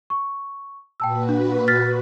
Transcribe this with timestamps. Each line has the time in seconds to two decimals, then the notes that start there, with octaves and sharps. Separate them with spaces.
0.10 C#6
1.00 A#2 F#4 B4 G5 A5 E6
1.29 D4
1.68 F6 A6 B6